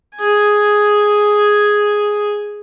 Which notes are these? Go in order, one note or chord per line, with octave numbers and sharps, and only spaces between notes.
G#4 G#5